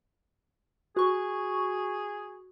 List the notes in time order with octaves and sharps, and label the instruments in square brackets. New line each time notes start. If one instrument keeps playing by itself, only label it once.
[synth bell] F#4 C#6 [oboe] G#4